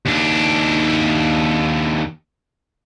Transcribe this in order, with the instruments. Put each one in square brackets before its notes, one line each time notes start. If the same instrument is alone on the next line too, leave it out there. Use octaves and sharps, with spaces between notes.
[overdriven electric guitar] D#2 D4